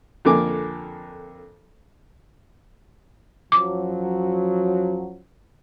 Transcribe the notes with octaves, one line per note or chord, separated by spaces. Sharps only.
F2 D3 A#3 G#5 D6
F#2 F3 F#3 D6